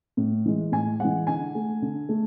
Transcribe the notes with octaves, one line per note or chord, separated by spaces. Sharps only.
A2
E3 G#3
A2 G#5
E3 G#3 F#5
D3 G#5
A3
D3
A3